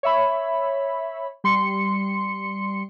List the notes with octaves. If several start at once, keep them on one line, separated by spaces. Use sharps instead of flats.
C#5 E5 B5
G3 C6 C#7